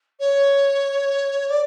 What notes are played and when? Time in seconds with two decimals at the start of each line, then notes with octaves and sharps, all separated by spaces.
0.20 C#5
1.50 D5